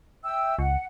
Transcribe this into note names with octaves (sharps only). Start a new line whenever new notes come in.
E5 G5 E6
C#2 F#5